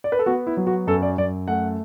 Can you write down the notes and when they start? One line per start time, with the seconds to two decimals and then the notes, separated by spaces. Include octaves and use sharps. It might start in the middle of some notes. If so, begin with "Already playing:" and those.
0.04 D5
0.12 B4
0.19 A4
0.26 B3 F#4
0.47 E4
0.57 F#3
0.67 F#4
0.87 F#2 A4
1.03 D5
1.18 F#2 D5
1.48 A3 F#5